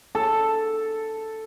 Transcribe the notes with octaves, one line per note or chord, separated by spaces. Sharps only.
A4